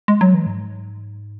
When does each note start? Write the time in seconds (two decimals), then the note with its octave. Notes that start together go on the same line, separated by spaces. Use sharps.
0.08 G#3
0.21 F#3
0.34 E3
0.46 G#2